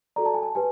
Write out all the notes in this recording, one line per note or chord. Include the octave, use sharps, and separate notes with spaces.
F#4 A4 D5 A#5
A5
G#5
A5
G4 B4 G#5